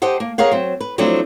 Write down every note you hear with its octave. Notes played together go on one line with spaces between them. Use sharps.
G4 C5 D#5 F#5 A5
A#3
G#4 A#4 C#5 F5 F#5
F#3 C4
B4
F3 F#3 A3 C4 D4 E4